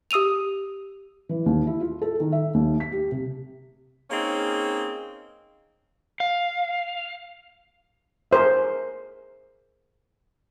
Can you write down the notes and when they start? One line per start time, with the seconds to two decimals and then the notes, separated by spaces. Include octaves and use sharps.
0.11 G4 D#6 E6 D#7 F7
1.29 E3
1.46 D#2
1.67 E4
1.81 F4
2.02 A4
2.20 D#3
2.32 E5
2.54 D#2
2.80 B6
2.92 G4
3.12 C3
4.11 A#3 C4 C#4 D#4 G#4
6.20 F5
8.31 G#4 A#4 C5 E5